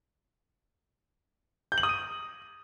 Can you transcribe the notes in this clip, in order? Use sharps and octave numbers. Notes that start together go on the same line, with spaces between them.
G6
F#7
D#6
D#7